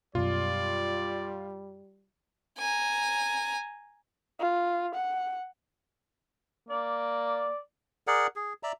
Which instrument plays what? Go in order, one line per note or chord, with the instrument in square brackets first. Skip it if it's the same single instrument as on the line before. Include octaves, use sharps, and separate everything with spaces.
[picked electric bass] F#2 B2 [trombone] G3 [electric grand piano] F4 [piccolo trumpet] D5
[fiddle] G#5 A#5
[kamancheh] F4
F#5
[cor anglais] A#3 [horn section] D5
[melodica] G#4 A#4 D5 F#5
G#4
D5 E5 A#5